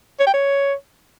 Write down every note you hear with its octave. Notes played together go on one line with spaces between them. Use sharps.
C#5
G5
C#5